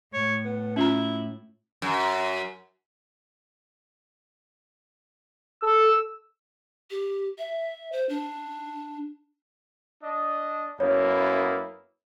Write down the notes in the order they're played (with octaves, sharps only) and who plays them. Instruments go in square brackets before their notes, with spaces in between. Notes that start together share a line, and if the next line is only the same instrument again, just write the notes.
[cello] A2 [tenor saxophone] C#5
[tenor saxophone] B3
[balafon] C#4 F4 A#5 [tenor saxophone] E4
[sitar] F#2
[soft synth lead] A4 [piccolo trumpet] E6
[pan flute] G4
E5
C5
D4
[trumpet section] D4 D#5
[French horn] F#2 [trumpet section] A#3 B3 E4 [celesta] C#5